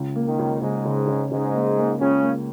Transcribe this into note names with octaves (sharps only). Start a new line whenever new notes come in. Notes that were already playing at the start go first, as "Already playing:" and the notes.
Already playing: C#2
A#3
D#3
C#2
C#2 G#2 G#3
C#3
C#3
G#2 C#3 G#3
A#3
A#3
C#2 C#3 C#4
A#3